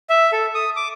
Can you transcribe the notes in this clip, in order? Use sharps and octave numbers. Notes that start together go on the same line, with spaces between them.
E5
A4
D#6
D6